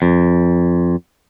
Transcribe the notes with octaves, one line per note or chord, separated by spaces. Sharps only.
F2